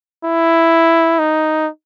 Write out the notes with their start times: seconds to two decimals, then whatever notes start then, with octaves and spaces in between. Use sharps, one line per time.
0.24 E4
1.19 D#4